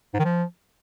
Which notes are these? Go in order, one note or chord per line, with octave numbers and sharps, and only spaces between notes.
G#2
D#3
F3